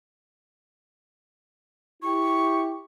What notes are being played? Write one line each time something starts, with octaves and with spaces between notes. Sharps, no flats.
E4 G4 C#6